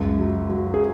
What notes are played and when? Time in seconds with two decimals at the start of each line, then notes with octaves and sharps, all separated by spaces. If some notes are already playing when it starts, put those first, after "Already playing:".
Already playing: C#2 F#2
0.19 F#3
0.49 F#3
0.74 G#4